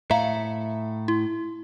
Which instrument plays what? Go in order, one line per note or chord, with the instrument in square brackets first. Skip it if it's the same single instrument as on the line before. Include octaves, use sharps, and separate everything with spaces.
[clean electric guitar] A2 E5 [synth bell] F5 A#5
[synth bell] E4